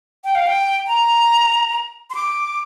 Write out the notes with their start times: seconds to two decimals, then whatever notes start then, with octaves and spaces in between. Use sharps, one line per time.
0.24 G5
0.35 F5
0.47 G5
0.87 A#5
2.10 C6
2.15 D6